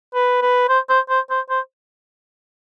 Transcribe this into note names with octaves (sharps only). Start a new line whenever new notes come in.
B4
B4
C5
C5
C5
C5
C5